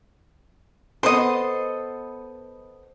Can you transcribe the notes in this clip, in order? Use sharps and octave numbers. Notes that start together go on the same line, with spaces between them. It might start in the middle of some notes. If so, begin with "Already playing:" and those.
B3 A4 C5 D#5 C6